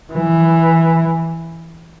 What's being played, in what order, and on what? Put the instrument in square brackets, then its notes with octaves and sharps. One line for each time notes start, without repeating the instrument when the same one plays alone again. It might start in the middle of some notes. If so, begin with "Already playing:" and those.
[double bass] E3